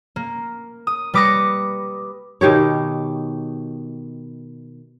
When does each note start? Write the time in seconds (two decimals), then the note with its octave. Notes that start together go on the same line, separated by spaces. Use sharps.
0.16 A#3
0.87 D#6
1.14 G3 B4 D6 D#6 A#6 C#7
2.41 B2 D#3 G4 C#5